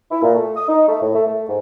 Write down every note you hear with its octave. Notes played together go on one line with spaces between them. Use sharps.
E4
A#2
A3
D#6
D#4
A3
A2
A3
A3
G#2